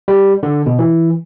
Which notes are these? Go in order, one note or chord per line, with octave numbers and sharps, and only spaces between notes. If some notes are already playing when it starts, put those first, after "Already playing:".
G3
D3
B2
E3